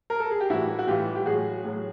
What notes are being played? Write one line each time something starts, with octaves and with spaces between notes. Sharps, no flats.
A#4
A4
G#4
G4
A2 E3 G3 E4 F#4
F#4
A2 E3 G3 F4 G4
G4
A2 F#3 F#4 G#4
A2 F#3